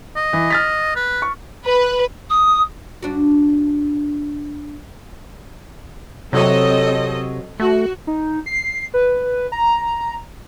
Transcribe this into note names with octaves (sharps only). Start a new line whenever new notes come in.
D#5
E3
F6 A6 B6
B4
C#6
B4
D#6
G2 D4 F#4
C3 F#3 C4 A4 C#5 D#5
A3 F#4
D#4
C7
B4
A#5